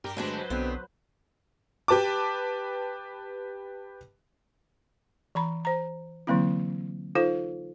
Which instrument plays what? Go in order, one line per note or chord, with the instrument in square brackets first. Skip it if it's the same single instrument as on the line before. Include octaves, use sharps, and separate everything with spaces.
[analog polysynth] G2 G4 G5 [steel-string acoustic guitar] A#4
[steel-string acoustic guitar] D2 G#3 D4 [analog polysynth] F#3 B4 C5
[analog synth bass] B1 [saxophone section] B2 D3 C4 [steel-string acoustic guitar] B3
[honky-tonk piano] G4 B4 A5 D6
[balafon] E3 A#5 B5
C5 A#5
D3 E3 F#3 A#3 C4 E4
D#4 F4 A4 C5 F5